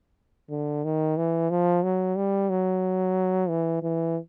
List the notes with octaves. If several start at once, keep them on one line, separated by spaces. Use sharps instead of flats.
D3
D#3
E3
F3
F#3
G3
F#3
E3
E3